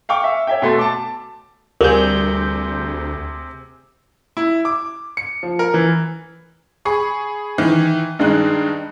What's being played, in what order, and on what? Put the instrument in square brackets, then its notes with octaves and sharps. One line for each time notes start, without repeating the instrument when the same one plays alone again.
[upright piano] F5 G5 C#6 D6
E5
C#5 E5 G5
B2 A3 C6
A5 D6
[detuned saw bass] D2 [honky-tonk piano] C3 C4 G#4 [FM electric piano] G3 G6 [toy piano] A#4
[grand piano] E4
D6
C#7
F3
A#4
E3
[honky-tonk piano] G#4 B5 C#6
D#3 E3
G2 D#3 G#3 D#4 F#6